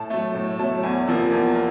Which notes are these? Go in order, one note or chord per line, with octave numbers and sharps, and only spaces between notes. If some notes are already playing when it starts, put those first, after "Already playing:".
Already playing: A2 A5
F#3 A3
A2
F#3 A3 A5
E2 G#5
C3 F3 A#3
E2
A#3